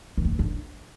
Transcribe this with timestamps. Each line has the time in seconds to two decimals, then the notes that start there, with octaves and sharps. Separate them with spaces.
0.18 D#3
0.25 A#3
0.32 E3
0.39 D4